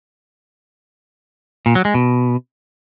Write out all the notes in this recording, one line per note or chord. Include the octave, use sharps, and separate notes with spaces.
A#2
F#3
G#3
B2